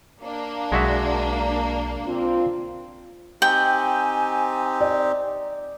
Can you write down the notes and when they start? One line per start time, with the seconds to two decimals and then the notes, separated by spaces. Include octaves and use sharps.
0.22 A#3 D4
0.72 B1 G#3 F#4 E5
2.07 C4 F4
3.42 C4 D#4 G4 G5 G#5
4.81 D5